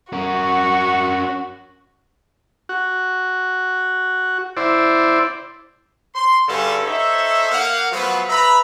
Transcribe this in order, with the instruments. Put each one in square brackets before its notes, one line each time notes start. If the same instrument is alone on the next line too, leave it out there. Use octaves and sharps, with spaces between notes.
[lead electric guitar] C#4 A#4 [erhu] F#4
[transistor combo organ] F#4
E4 C5 D5
[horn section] C6
G2 D3 G3 C#4 G#4 A4
D#4 A4 C5 C#5 E5
A#3 F5 F#5
F3 F#3 A3 B3 F4 B4
B4 E5 A#5 B5